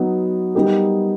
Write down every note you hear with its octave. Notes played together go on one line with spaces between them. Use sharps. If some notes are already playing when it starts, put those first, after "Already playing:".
Already playing: F#3 B3 D#4
G3 B3 D#4 G4 A#4